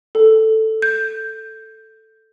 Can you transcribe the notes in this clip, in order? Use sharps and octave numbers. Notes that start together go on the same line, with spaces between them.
A4
G6